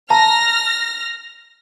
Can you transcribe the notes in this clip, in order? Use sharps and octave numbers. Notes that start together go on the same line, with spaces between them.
A5 A#5 F6 A#6